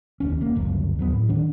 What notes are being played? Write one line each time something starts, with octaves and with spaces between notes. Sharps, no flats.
F1 D#2 C#4
E1 A#3
G1 C#2 F#2
D#2 F#3 B3
A2
D#3 D4